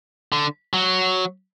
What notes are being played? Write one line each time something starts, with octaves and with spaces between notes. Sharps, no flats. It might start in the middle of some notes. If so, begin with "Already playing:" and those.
D3
F#3